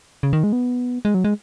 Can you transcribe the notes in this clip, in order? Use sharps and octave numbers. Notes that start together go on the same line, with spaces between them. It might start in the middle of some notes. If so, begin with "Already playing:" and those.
C#3
D#3
G#3
B3
G#3
F#3
G#3